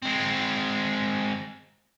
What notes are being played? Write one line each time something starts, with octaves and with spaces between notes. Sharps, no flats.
G#3 C4